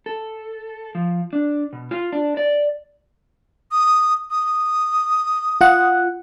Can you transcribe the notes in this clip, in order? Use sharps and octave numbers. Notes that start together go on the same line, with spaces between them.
A4
F3
D4
B2
F4
D4
D5
D#6
D#6
F4 F#5